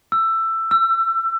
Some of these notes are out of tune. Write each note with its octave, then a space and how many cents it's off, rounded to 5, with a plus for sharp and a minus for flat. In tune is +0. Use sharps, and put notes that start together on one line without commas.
E6 +15
E6 +30